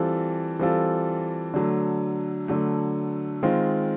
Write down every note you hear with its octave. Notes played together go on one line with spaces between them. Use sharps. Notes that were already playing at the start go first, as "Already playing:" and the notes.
Already playing: E3 G3 C4 F4 A4
E3 G3 C4 F4 A4
D3 F#3 A3
D3 F#3 A3
D#3 G#3 C4 F4